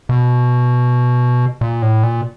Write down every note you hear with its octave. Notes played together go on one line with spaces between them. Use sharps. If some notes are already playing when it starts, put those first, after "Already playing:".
B2
A#2
A2
A#2